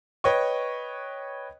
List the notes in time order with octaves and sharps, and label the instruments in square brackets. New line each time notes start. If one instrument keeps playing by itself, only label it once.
[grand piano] B4 C#5 D#5 G5 C#6